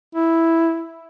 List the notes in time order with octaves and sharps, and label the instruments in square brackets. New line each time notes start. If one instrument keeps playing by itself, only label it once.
[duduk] E4